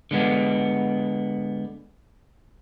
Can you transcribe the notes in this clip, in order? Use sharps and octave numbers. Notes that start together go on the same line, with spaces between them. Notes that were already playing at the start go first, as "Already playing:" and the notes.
D3 G#3 B3